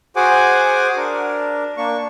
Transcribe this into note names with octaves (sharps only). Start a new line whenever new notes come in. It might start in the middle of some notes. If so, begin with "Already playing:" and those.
F#4 G#4 C5 F#5 G#5 D6
D4 A#4
A#3 D4 C#6